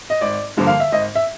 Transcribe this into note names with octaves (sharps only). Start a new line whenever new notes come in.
D#5
G#1 D5
G2 D3 F3 A#3
F5
E5
G#1 D#5
E5